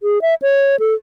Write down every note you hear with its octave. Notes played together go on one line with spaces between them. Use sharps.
G#4
E5
C#5
A4